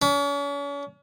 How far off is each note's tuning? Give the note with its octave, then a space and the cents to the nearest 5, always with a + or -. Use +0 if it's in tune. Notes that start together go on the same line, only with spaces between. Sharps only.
C#4 +40